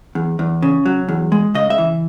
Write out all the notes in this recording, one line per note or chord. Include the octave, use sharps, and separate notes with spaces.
E2
E2
C#3
F#3
E2
G#3
C#3 D#5
E5
E3